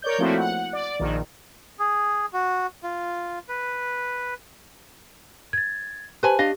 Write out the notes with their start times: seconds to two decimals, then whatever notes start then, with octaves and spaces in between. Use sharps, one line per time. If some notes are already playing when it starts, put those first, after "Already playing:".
0.02 A#4 C#5 D5 G6
0.18 F3 A3 A#3 C4 E4 F#4
0.38 F#5
0.73 D5
0.99 A#1 D#3
1.79 G#4
2.33 F#4
2.83 F4
3.49 B4
5.53 G#6 A6
6.23 G4 B4 C5 G#5 A5 B5
6.39 D4 G4 D#5 F5